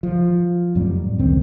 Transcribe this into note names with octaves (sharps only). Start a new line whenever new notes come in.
F3
F2 A2 F#3 G3
C#2 A2 D#3 C4